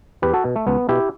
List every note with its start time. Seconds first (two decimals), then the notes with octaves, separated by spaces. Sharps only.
0.22 E2 G4 B4
0.34 F#4 A4
0.45 B2
0.56 A3
0.67 C#2 B3
0.89 B2 E4 G4